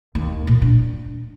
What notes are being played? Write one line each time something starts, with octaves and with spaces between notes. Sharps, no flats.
D#2
A#2
D4